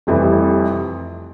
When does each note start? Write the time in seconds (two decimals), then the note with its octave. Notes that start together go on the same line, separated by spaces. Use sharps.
0.07 F1 F2 E3 G3